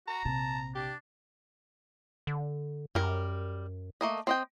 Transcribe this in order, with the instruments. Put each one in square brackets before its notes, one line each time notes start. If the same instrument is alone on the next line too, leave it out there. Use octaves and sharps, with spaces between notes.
[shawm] F#4 [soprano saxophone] A#5
[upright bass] A#1 C3 [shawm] A5
[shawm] D4 [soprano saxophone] G4
[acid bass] D3
[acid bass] F#2 [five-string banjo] G3 A#4
[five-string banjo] A3 A#3 D#5
C4 D#5 G5